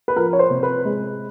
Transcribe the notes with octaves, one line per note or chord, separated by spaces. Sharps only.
B4
F3 A#4
C#5
C5
C3
B4
G#3